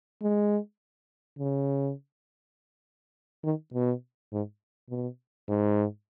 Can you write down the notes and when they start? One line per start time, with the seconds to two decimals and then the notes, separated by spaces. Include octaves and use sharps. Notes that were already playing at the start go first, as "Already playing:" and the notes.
0.22 G#3
1.39 C#3
3.44 D#3
3.74 B2
4.32 G#2
4.90 B2
5.49 G#2